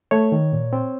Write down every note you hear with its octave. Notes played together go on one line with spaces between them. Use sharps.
A3 C#5
D#3
A#2
C4